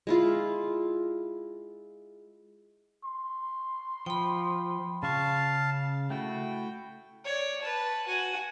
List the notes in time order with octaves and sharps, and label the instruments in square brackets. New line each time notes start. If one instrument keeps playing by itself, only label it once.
[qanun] G#3 E4 F4
[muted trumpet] C6
[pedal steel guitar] F3 [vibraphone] G5 B5
[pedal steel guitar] C#3 C#6 [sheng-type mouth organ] F5 A5
[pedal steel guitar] A3 E4 F#4 [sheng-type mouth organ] G5
[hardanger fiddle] C#5 D5
B4 A5
F#4 G#5